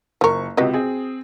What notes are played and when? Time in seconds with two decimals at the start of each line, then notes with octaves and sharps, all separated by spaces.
0.21 F#1 F3 A#4 C#6
0.57 C#2 C3 F#4 B4 D#5
0.73 C4 G#4